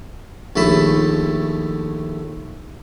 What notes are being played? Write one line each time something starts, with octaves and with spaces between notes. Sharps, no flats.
A#1 D#2 A3 A5 B5